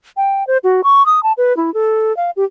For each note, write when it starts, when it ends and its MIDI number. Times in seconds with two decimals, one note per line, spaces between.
0.17 0.46 79
0.47 0.58 72
0.64 0.81 66
0.84 1.05 85
1.06 1.22 87
1.23 1.32 81
1.37 1.55 71
1.57 1.73 64
1.74 2.15 69
2.17 2.31 77
2.36 2.44 67